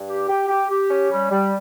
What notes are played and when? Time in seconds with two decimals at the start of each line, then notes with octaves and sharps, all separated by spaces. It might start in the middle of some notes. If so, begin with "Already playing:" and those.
Already playing: G2
0.08 G4
0.28 G4
0.48 G4
0.69 G4
0.89 C#4
1.10 G3
1.30 G3